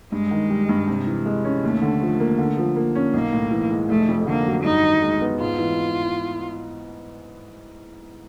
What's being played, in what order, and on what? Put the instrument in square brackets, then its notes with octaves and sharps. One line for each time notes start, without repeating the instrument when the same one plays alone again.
[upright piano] G2 [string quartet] G#3
[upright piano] D#3
G3
G2
C3
E3
G#3
C#4
[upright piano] D#2 [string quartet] A3
[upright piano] D3
F3
A#3
D3
F3
A#3
C#4
[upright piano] B1 [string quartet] A#3
[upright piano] A2
E3
G#3
[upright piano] F1 [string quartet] A3
[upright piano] F2
[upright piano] D3 [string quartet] A#3
[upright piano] F#3
[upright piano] G2 [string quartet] D#4
[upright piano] D#3
G#3
B3
[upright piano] G#2 [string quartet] F4
[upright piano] E3